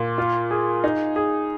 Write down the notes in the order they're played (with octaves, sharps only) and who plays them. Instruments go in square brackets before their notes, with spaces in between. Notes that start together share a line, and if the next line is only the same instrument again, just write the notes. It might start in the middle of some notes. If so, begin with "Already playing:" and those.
Already playing: [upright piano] A#2
F4
G#4
D#4
G#4